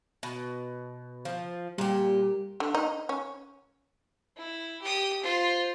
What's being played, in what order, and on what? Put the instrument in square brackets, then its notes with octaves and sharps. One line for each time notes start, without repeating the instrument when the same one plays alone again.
[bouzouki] B2
F3
[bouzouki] A#2 G4 [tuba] G3
[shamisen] D3
D#4
C#4
[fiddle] E4
G4 D#6
F4 C5